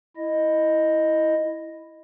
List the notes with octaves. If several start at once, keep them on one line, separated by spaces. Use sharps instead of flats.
E4 D#5